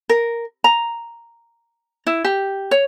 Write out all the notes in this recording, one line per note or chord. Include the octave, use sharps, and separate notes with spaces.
A#4
A#5
E4
G4
C#5